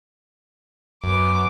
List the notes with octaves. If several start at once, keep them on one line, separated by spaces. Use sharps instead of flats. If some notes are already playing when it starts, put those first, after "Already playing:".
F#2 B3 D6